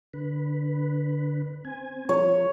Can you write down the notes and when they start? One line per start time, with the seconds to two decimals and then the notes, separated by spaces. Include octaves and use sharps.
0.14 D3 B4
1.65 C4 G#5
2.09 F3 C#5